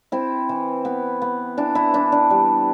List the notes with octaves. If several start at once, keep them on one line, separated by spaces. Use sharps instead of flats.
C4 E4
E3
B3
B3
E3 D4
E4
E3 D4
D4
G3